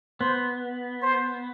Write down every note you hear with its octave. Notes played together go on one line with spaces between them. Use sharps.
B3 C5
C5